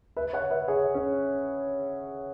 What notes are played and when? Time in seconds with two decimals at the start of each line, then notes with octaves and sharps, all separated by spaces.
0.17 B4 E5
0.33 C#5 F#5
0.50 B4 E5
0.68 G#4 C#5
0.95 C#4